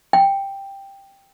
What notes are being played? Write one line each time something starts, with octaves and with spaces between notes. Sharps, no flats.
G5